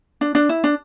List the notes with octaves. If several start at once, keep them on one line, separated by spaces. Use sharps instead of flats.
D4
D4
E4
D4